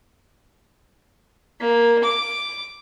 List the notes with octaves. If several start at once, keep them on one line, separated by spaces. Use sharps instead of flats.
A#3
D6